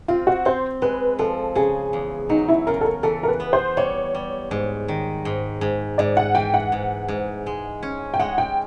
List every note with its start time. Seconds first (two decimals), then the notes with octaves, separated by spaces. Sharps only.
0.08 C4 F4
0.27 F#4
0.45 C4 C5
0.82 G#3 B4
1.19 F3 A4
1.56 C#3 G#4
1.93 E2
2.29 F#3 D#4
2.48 E4
2.67 C#3 A#4
2.81 A4
2.85 A#4
3.03 E3 A4
3.23 A#4
3.28 B4
3.40 B3
3.53 C5
3.77 G3 C#5
4.14 G3
4.51 G#2
4.88 D#3
5.25 G#2
5.61 G#2
5.98 G#2 D5
6.17 F#5
6.35 E3 G5
6.54 F#5
6.72 G#2
7.08 G#2
7.46 G#3
7.83 C#4
8.14 G5
8.20 G#3 F#5
8.38 G5